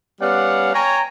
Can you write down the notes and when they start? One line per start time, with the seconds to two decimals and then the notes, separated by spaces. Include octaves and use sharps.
0.21 G3 B3 C#4 D5 F5 F#5
0.73 C#5 G5 G#5 A#5